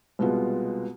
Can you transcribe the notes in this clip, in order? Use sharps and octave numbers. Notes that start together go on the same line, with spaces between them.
C2 B2 G#3 B3 F4